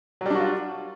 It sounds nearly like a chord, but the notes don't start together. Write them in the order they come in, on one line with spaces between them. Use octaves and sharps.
F#3 G3 D4 F#4 F4